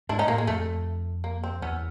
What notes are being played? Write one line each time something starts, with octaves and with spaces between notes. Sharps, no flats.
G#2 D4 E4
C#4 D#4
A2 A#3
G#3
F2 A3
A#3
C4
E2 B3 C#4